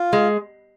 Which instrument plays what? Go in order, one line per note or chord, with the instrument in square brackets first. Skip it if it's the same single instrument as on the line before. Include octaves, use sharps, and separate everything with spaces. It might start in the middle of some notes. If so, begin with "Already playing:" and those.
Already playing: [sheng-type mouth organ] F4
[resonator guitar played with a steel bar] G#3